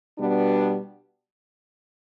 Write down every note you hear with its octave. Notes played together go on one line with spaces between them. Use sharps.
B2 G3 B3 D4